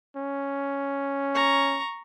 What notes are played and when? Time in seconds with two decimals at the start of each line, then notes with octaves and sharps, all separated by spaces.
0.16 C#4
1.34 A#5 C#6